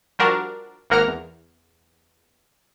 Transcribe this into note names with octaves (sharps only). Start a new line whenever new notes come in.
F3 G3 D4 F#4 A#4
G#1 A#3 A#4 F#5 A#5 F6
E2